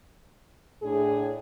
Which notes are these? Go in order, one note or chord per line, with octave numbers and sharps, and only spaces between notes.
A2 D4 G#4